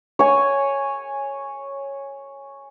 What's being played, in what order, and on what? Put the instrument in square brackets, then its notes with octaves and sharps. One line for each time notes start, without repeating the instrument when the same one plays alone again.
[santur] C#5 G#5